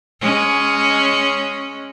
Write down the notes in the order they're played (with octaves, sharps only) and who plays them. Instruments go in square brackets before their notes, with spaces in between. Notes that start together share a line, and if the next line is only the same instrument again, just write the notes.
[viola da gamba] G#3 C#4